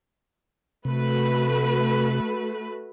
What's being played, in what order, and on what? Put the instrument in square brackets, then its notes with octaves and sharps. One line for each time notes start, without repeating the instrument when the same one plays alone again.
[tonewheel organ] C3 [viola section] A3 F#4 B4